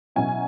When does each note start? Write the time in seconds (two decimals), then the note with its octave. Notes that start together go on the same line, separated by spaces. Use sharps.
0.16 B2 F#3 C#4 E4 G#5